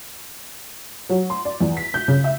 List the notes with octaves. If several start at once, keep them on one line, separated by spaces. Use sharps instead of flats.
F#3
C6
D5
E2
B6
G6
C#3
E5